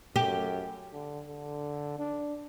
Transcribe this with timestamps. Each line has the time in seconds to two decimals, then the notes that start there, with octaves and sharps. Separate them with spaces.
0.16 F#2 G4
0.93 D3
1.28 D3
1.99 D4